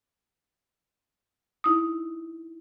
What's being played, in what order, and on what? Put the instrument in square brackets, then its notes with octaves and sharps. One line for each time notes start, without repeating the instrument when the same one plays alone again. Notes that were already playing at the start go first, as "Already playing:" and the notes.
[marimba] D#4 E4 D#6